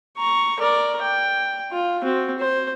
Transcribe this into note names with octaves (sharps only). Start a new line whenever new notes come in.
A#5 C#6
A#4 D5
G5
F4
C4 F#4
C5